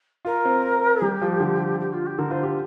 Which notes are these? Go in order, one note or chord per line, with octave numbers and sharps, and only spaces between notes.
F4 A#4
C4
G3 G4
F3
D3
G4
F4
G4
D3 A#4
F4 C5
G4